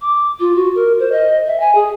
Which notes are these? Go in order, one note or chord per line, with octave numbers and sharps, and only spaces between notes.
D6
F4
F#4
A#4
C5
D#5
E5
G#5
G#4